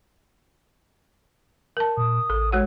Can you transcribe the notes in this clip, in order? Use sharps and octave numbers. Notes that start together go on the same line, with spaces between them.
A#4 A5
A#2 D#6
A1 A4
G#3 F#4 C#5 F#5